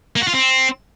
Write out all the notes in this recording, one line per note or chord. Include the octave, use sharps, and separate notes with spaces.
A#3
F#4
F4
C4